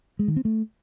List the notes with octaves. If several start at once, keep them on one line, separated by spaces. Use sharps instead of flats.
G#3
D#3
C4
A3